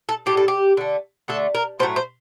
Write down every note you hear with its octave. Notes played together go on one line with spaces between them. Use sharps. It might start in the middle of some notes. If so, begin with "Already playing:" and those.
A4
A2 G3 G4
A4
G4
D3 A3
D3 A3 A4
A#4
A2 F#3 A3 C5
C5